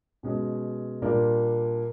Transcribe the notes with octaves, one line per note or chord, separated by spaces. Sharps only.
B2 G#3 C#4
A#2 G3 A#3 D4 F4